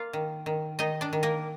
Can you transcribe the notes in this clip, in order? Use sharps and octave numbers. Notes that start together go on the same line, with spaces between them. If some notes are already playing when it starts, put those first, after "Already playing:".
Already playing: A#3 F4 F5
D#3
D#3
D#3 D#4 D#5
D4 D5
D#3
A#3 A#4